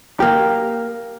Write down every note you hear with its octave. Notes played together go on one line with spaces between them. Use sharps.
A#3 G4